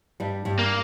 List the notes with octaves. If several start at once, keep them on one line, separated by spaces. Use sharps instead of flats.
G2 G3
G2 G3
A#3